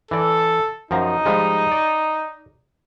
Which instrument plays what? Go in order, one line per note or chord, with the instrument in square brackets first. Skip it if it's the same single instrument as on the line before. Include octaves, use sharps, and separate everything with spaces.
[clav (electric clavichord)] E3 D5 [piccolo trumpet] A4
[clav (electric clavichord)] F#2 F3 A#5 [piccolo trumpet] D#4
[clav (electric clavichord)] F3 G3 G#3
D5